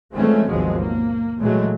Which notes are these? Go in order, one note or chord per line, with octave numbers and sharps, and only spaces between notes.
E3 F3 G#3 A3 C4 C#4
G#1 D#2 B2 F3 F#3 G#3
A#3
A#2 E3 F#3 G#3 A3